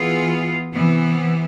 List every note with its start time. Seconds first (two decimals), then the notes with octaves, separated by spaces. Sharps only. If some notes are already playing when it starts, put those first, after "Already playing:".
Already playing: E3 B3 F4 G#4
0.74 C3 E3 B3